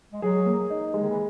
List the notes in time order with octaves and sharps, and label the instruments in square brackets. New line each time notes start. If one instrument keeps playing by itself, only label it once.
[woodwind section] G#3
[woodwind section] F#3 [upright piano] G#4
[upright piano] A#3
D#4
G#3
[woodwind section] D#3
E3